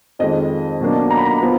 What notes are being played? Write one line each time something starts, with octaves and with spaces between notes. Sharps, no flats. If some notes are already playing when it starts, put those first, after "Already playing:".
F2 D#3 G#3 D#5
B2 F#3 A#3 D4
A#5
B5
A#5
F3 B3